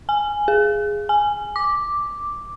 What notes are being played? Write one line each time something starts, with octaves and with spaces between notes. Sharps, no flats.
G#5
G#4
G#5
D6